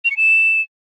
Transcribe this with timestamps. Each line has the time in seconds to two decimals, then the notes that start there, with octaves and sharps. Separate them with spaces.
0.05 F7
0.11 C#7
0.17 E7